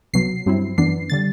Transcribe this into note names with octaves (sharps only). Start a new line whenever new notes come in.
C2 B2 F#3 C7
G2 F#3 C4 E4
F#2 E3 B3 D4 C7
D3 G3 A6